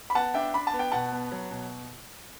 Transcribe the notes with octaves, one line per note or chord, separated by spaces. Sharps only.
B5
B3 F#5 A5
D4 E5 G5
D4 B5
A5
B3
G5
B2 F#5 A5
B3
F#3
B2